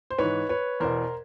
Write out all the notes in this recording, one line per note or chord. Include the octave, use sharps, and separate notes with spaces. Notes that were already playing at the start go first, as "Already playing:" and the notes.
C5
G#2 E3 B4 C#5
B4 C#5
E2 B2 A#4 C5